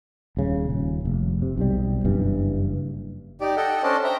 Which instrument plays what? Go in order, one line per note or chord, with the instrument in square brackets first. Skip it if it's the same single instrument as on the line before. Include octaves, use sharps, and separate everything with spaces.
[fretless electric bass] D#1 C#3
D#1
F1
C3
B1 C3 G3
F#1 G2 E3
[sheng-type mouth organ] D#4 G4 D5
A4 D#5 F#5 G5
C#4 D4 C5 D5 D#5 A5
C5 E5 G5 A#5